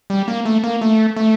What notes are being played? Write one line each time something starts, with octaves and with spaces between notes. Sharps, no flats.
G3
A#3
A3
A#3
A3
A3